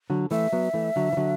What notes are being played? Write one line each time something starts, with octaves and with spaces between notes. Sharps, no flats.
D3 F#3
E3 A3 E5
F#3 B3
E3 A3
D3 F#3
E3
D3 F#3